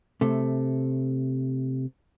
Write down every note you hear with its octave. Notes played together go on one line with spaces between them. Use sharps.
C3 A3